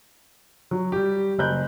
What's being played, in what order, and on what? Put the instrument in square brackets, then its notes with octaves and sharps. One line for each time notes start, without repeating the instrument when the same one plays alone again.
[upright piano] F#3
G3 G4
F#1 F#6 G6